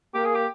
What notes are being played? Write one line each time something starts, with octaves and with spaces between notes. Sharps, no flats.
A#3 G4
G#4
G4